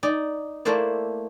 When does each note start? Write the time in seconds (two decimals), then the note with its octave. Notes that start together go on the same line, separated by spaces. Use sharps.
0.03 D#4 D5
0.65 A3 A#3 E4 C5 D5